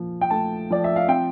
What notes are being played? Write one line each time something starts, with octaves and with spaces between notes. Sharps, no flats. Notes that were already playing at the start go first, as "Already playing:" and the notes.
Already playing: A#2 F3
G5
A3 A5
F3 D5
E5
F5
C4 G5